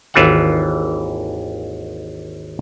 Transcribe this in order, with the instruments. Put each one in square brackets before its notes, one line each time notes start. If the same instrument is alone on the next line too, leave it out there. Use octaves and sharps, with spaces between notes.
[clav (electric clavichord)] G#1 D#2 E3 F4 E5 F#5